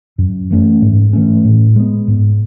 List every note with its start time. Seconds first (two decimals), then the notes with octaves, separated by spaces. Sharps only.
0.18 F#2
0.50 E3 A3 C#4
0.82 G#2
1.13 E3 A3 C#4
1.44 A2
1.76 G#3 B3
2.08 G#2